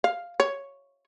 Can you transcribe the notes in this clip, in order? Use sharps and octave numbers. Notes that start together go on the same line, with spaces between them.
F5
C#5